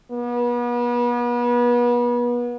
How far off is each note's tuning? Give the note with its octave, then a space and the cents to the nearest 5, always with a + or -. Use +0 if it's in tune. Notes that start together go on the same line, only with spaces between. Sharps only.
B3 -35